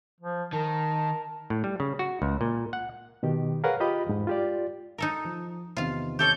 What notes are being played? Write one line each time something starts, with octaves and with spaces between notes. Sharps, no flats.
F3
D#3 A#4 A5
A2
G3
C#3
F#4
C#2
A#2
F#5
B2 D#3 G4
G#4 A#4 B4 C#5 F5 F#5
F4 G4 D#5 B5
E2 G#2
F4 G4 D5
D#4 A4 A#4
F3
E2 C3 D#3 F4 F5
G4 A4 C#5 G6